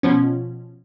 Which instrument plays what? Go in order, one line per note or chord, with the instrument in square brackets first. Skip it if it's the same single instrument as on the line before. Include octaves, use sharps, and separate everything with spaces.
[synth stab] B2 F3 C#4